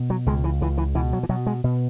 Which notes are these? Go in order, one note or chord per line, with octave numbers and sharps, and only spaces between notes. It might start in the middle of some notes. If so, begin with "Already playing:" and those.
Already playing: B2
F#3
C#2 G#3
E3
C#2 E3
E3
B2 E3
F#3
E3
B2 F#3
G#3
B2